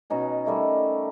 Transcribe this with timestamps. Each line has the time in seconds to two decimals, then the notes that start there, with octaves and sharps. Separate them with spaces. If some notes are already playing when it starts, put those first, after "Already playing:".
0.10 B2 C#4 D#4 G#5
0.45 D#3 G3 A3 D#4